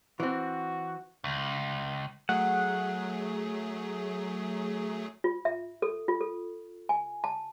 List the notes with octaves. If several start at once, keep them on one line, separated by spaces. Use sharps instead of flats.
E3 C4 F#4
C#2
F#3 A3 G#4 F#5
F4
E5
A4
F4
A4
G#5
A5